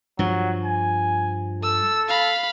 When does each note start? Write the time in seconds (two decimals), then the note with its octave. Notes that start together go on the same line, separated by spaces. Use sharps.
0.19 G2 F3 F#3
0.65 G#5
1.63 A4 E6
2.09 F5 B5